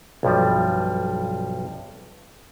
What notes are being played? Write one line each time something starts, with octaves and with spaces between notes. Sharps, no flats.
B1 G2 F3 G3